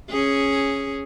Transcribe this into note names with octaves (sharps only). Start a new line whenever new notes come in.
C#4 G#4